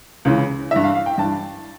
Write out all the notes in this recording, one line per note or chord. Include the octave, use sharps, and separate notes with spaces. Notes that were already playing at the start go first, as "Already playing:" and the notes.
C#2 C#3 E3
G2 E3 E5
F5
F5
G5
G2 E3 A5